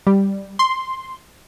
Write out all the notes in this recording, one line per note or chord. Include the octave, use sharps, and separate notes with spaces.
G3
C6